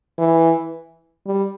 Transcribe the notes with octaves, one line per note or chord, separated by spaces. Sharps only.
E3
G3